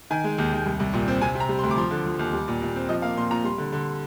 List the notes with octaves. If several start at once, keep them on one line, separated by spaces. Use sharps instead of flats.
D#3 G#5
G#3
D#2
D#2
C2
C2
A#2
C4
C3 G#5
C3
A#5
G3
C6
D2
D6
F3 C6
D3
F3
D#2
G3
A#2
A#2
C4
F3 D#5
A#3 F5
A#2 C6
A#2 A#5
G3 C6
D3
D3